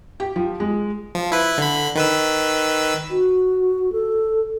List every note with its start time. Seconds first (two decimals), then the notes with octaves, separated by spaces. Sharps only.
0.20 G4
0.36 F3
0.60 G#3
1.15 F3
1.32 E4 B4
1.58 D3 B5
1.95 D#3 B4 E6
3.10 F#4
3.92 A4